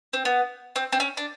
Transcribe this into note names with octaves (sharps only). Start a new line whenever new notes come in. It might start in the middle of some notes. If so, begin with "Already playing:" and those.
C4
B3
C4
C4
C#4
D4